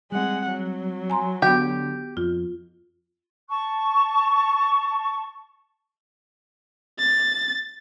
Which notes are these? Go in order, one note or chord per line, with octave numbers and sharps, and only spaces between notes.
G3 G#3 C4 F#5
F#3
G#5 A#5 C6
D3 B3 F#4 G4
F2 F4
A5 C#6
A6